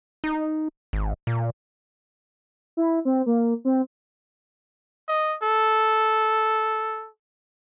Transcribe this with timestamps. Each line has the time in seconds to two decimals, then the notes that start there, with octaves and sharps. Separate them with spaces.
0.24 D#4
0.93 G#1
1.27 A#2
2.77 E4
3.05 C4
3.26 A#3
3.65 C4
5.08 D#5
5.42 A4